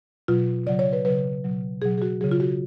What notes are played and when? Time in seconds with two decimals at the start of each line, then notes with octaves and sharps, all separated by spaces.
0.28 B2 F#3 F4
0.67 C#3 D5
0.69 F#3
0.79 C#5
0.93 B4
1.05 C#3 F#3 B4
1.44 B2 F#3
1.82 B2 F#3 G#4
1.98 G#4
2.02 F#4
2.21 F#3 G#4
2.24 C#3
2.31 F4
2.40 F#4